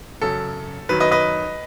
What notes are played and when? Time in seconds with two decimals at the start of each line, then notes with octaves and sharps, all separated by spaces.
0.21 F#2 C#3 F#3 A4
0.89 F#2 D#3 F#3 B4
1.00 B4 D#5
1.11 B4 D#5